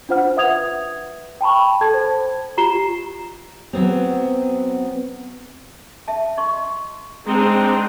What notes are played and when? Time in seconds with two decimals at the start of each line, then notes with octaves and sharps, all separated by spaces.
0.09 D4 F4 C5 F#5 F6
0.36 B4 E5 F#5 D#6 G#6 F7
1.41 G5 A5 B5 C#6
1.81 A4 A5 G#6
1.94 C5
2.57 F4 G4 A#5 C7 E7 G7
3.73 F#3 B3 C4
6.08 E5 A5
6.37 D#5 C6 C#6
7.27 G#3 C4 D4 D#4 G#4